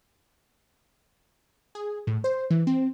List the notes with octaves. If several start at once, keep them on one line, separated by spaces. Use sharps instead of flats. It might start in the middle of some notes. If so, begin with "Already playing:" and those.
G#4
A2
C5
E3
C4